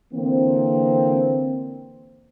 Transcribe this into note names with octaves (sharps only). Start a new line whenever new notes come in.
D3 E3 A#3 C4